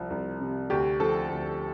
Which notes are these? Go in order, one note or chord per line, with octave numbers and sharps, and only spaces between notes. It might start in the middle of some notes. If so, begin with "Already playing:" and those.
Already playing: C2 F3
C2
C3
D2 G4
F3 A4
D2